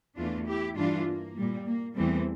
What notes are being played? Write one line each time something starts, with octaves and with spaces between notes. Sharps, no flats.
E2 E3 A3 D4 F4
E4 G4
G2 E3 G3 D4 F4
A#3
A#2 G3
A#3
E2 E3 G3 A3 C4